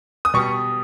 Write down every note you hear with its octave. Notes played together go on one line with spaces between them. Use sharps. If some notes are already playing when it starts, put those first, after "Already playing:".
D#6
B2 G3 C#6